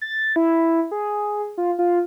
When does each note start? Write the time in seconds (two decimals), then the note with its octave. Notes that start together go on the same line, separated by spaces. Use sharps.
0.01 A6
0.36 E4
0.91 G#4
1.58 F4
1.79 F4